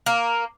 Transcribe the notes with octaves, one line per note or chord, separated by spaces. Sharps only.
A#3